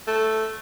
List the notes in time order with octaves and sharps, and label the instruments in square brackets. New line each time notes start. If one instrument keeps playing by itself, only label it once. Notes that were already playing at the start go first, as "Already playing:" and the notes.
[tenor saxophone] A3